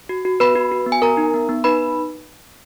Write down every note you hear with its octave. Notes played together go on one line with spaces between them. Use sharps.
F#4
F#4
B3 B4 B5
F#4
F#4
B3
G#5
B3 A#4 A#5
D#4
B3
B3
D#4 B4 B5